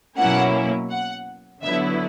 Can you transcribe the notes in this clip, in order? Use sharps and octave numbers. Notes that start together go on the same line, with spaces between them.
B2 F#3 A#3 C#4 E4 F#5
F#5
D3 F#3 B3 E4 E5